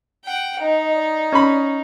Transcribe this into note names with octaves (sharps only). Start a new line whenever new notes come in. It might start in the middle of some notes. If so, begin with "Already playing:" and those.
F#5 G5
D#4 D#5
D5
C#4 B5